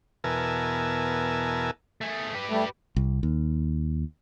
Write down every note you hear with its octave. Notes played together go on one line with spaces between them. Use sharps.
E2 B2 A#4 E5 G#5 A5
A3 G#4
G4 B4
G3 A3
C2
D#2